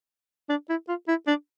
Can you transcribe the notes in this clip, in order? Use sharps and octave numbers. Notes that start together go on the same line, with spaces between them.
D4
E4
F4
E4
D4